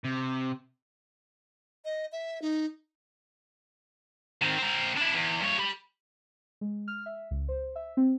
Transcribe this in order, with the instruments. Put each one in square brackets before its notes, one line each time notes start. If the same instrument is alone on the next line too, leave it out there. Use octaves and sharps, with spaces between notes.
[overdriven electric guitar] C3
[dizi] D#5
E5
D#4
[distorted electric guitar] D#3 C4
C4 A#4
D4 E4
E2
G2 C#5
G4 B5
[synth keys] G#3
F6
E5
C#2
C5
E5
C4